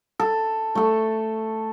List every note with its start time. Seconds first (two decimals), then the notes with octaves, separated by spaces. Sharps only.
0.19 A4
0.75 A3 A4